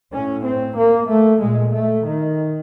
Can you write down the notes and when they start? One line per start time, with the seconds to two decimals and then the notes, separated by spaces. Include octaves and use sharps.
0.12 A2 C#4
0.45 C4
0.77 A#3
1.09 A3
1.41 A#2 G#3
1.73 A3
2.06 D#3